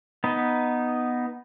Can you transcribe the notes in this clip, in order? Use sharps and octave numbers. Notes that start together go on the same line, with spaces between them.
B3 D#4